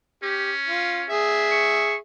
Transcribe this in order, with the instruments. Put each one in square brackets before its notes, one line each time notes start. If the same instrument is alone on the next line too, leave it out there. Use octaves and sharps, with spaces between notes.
[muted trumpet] C#4 [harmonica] G4
[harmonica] F4
G#4 E5
[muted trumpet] C#6